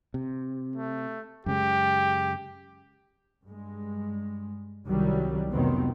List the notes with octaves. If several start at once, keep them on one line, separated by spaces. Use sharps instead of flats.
C3
A3
F#2 C#3 G#3 G4
G2 G#3
C2 D#3 F#3 G3
F1 D#3 F#3 B3 C4